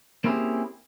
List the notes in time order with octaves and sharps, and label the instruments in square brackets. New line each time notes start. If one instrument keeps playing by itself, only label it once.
[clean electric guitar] A#3 C4 C#4 E4 G4 G#4